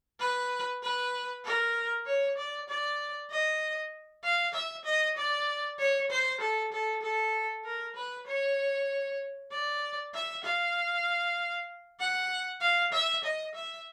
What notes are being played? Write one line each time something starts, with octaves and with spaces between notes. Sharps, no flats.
B4
B4
A#4
C#5
D5
D5
D#5
F5
E5
D#5
D5
C#5
C5
A4
A4
A4
A#4
B4
C#5
D5
E5
F5
F#5
F5
E5
D#5
E5